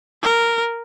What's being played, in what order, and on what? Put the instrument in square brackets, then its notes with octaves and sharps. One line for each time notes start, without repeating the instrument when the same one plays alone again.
[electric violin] A#4